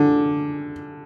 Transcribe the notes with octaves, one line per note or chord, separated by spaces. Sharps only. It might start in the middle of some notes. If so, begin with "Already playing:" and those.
Already playing: D3